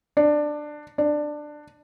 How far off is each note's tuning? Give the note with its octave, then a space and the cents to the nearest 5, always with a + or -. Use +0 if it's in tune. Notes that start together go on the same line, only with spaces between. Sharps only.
D4 +15
D4 +15